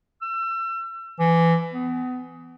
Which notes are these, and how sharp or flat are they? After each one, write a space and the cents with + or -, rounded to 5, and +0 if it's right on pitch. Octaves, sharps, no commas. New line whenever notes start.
E6 +35
E3 +20
B3 +30